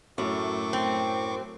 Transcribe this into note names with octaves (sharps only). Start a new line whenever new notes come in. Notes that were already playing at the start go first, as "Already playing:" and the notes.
F#2 A2 F#3 A3 C#6 D6
C4